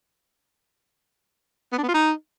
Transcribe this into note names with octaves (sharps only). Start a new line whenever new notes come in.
B3
D4
B3
F4
D#4